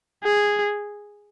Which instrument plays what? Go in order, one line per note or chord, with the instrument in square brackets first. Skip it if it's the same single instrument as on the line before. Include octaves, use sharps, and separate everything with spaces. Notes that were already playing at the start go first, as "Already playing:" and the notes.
[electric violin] G#4